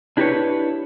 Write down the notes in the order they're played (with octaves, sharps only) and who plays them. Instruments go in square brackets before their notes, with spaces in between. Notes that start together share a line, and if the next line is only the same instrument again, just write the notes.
[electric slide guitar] D4 E4 G4 A#4 B4 C#5